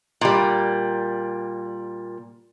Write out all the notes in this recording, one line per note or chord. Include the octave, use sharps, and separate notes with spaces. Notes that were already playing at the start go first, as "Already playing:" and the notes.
A#2 G3